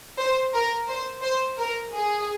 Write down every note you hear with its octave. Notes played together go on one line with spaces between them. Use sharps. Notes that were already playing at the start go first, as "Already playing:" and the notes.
C5
A#4
C5
C5
A#4
G#4